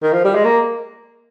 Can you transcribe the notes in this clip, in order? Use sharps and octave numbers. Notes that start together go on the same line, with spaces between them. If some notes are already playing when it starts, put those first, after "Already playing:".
D#3
F3
G3
G#3
A#3